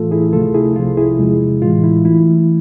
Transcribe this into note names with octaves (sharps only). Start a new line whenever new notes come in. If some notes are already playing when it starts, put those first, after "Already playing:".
Already playing: A2 E3 A3 F4 A4
E4 G#4
D2 C3 F3 A3 F4 A4
E4 G#4
C2 C3 F3 F4
E4 G#4
E2 C3 G#3
A2 E3 G#3 F4
E4
E3 A3 E4